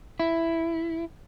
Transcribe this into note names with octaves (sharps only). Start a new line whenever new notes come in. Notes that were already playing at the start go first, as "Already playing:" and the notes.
E4